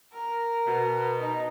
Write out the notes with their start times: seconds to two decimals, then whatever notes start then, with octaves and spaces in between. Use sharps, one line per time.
0.13 A#4
0.66 B2
1.20 D#4